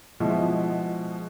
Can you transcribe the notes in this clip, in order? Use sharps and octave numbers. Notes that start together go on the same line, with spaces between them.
B2 F3 G#3 E4